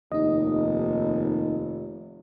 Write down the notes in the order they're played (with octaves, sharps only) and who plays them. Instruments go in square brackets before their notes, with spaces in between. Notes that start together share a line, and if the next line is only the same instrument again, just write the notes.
[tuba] F1 [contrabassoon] D#2 [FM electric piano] D#4 D#5